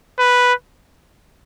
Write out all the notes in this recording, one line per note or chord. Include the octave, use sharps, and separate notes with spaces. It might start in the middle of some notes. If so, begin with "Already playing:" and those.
B4